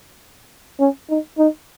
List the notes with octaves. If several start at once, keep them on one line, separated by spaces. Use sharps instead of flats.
C#4
D#4
D#4